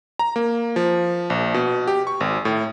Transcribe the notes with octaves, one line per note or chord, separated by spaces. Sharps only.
A#5
A#3
F3
A#1
B2
G4
C#6
G#1
A2